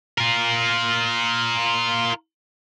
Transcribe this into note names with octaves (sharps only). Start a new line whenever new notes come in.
F4 A#4